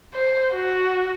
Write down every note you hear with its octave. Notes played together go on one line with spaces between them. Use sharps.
C5
F#4